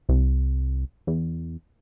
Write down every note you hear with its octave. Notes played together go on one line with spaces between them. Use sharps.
C2
E2